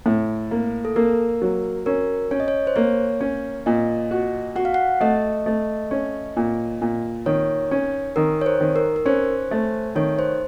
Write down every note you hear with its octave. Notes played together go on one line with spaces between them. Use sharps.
A2
A#3
A4
A#3 A#4
F#3
C#4 A#4
C#4 C#5
D#5
C#5
C5
A#3 C#5
C#4
A#2 D#5
F#4
F#4 F#5
F5
F#5
A3 D#5
A3
C#4
A#2
A#2
D#3 C#5
C#4
D#3 A#4
C#5
C5
D#3
A#4
A#4
C#4 C5
A3
D#3 C#5
C5